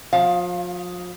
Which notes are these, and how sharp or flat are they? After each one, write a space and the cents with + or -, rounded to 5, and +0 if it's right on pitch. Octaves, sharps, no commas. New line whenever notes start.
F3 +35 F5 +0